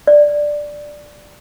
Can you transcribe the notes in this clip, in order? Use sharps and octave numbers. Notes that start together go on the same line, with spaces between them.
D5